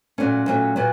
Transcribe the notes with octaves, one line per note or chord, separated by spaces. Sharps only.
A#2 F#3 A3 C#4
A#2 F#3 A3 C#4
A#2 F#3 B3